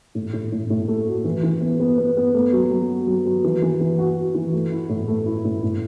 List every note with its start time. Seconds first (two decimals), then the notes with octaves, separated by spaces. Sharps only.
0.15 A2
0.33 A2
0.52 A2
0.70 A2
0.88 A3
1.07 F#4
1.24 E3
1.43 E3
1.61 B3
1.80 B3
1.98 B3
2.17 B3
2.34 A3
2.53 F#3
2.71 F#3
2.89 F#4
3.07 F#3
3.25 F#3
3.44 E3
3.62 E3
3.80 E3
3.98 F#4
4.17 F#4
4.35 E3
4.53 A3
4.72 E4
4.89 A2
5.08 A3
5.26 E4
5.44 A2
5.63 A2